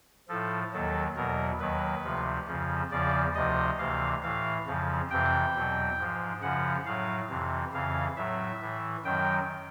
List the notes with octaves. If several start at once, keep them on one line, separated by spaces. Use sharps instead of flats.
A2 F3 A4
D#2 D#3 F#3 A4
E2 B2 F#3 A#4
D#2 D#3 F#3 B4
D2 C3 F3
F2 C#3 F3
E2 C#3 F3 D5
D2 C3 F3 D#5
D2 C3 E3 F5
A2 E3 F5
F2 C#3 F3
F2 C3 E3 G5
E2 B2 F#3
G#2 F3
F#2 C#3 F3 F#5
A2 F#3 F5
F2 C3 E3
F2 C#3 E3 F5
A2 F#3 E5
A2 E3
F#2 D#3 F#3 G5